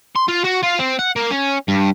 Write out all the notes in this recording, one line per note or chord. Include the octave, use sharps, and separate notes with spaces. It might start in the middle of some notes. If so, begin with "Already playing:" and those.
C6
F4
F#4
F4
C4
F#5
A#3
C#4
G2